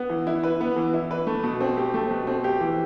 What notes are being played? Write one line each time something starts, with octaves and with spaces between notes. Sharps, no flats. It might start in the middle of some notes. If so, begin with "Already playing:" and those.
Already playing: B3
E3
E4
B4
B3
E3
E4
B4
A3
B2
C4
G4
A3
B2
C4
G4
E3